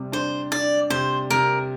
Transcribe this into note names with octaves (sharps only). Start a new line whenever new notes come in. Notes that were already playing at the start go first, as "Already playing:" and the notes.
Already playing: C3 G3
D4 C5
D4 D5
C3 C5
C3 A#4